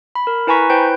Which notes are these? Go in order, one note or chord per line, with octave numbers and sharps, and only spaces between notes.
B5
A#4
E4 B4 G#5 A#5 C#6 B6
E4 B4 C5 G5 G6